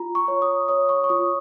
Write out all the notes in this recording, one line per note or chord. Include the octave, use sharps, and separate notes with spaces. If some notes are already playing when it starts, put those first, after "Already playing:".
Already playing: F4 A#5
C#6
C#5
D#6
C#5 D#6
C#6
C#6
F4 D#6